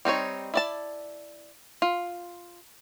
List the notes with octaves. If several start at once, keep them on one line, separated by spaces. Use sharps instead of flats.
G3 C4 D#4 C#5
E4 D5 A5
F4